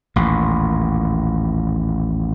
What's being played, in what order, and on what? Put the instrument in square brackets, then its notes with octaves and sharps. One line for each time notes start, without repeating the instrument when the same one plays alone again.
[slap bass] A1 D#2 A#2